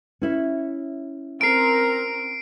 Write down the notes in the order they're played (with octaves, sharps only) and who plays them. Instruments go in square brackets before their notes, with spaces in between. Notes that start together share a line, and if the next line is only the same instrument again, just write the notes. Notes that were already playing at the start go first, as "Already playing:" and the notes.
[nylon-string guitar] C#4 E4 C#5
[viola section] C4 A#4 [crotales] C7 D7